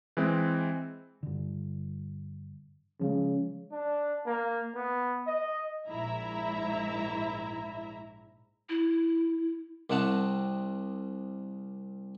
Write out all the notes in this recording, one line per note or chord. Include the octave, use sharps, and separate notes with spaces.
E3 G#3 C4
G2 D3
C#3 F3 G#3
D4
A#3
B3
D#5
A#1 G#2 E4 E5 A#5
E4
C2 C3 C4 F#5 A5